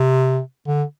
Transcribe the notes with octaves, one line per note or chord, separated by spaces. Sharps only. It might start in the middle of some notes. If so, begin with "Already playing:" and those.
Already playing: C3
D3